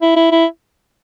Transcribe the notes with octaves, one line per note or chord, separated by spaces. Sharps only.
E4
E4
E4